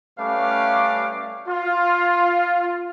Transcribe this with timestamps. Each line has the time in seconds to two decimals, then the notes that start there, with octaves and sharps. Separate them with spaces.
0.18 G3 A3 C#4 B4 F5 D6
1.49 F4